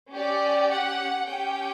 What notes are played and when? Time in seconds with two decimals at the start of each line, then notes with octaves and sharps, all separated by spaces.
0.14 C#4 G4 D5
0.71 F#5
1.27 C#4 G4 G5